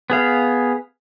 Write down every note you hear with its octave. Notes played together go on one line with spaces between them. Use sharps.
B3 G#4 F5